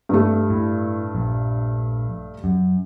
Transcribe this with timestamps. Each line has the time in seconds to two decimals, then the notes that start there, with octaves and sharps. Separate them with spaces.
0.09 G2 A3
0.50 A2
1.15 A#1
2.44 F#2